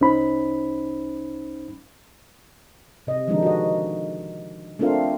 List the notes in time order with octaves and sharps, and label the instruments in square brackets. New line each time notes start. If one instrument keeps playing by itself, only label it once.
[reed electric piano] C2 C#4 D#4 C5 B5
[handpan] C3 D#5
D3 D#3 F3 G#3 D4 D#4
F#4 D#5
A3 C4 D4 F4 A#4 F5